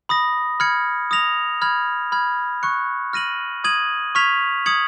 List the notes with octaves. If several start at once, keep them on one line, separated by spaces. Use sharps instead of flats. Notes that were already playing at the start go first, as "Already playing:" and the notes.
B5 D#6 A#6
B5 F6 G#6 C#7
D#6 A#6 F7
B5 F6 G#6
B5 F6 G#6
C#6 F#6 C#7
F6 A#6 D#7 F#7
D#6 G#6 D#7 F#7
C#6 F6 G#6 B6 F7
D#6 G#6 C#7 F#7